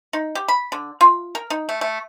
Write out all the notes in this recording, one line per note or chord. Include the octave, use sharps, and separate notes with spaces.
D#4
G4
B5
D3
F4
A#4
D#4
A3
A3